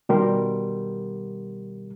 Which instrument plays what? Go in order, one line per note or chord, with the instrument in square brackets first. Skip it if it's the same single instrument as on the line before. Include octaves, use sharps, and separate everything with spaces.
[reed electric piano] B2 D#3 G3 G4 A#4 C6